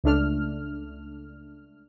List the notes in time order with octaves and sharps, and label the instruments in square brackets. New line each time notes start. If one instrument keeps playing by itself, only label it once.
[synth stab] C#2 A3 D4 F6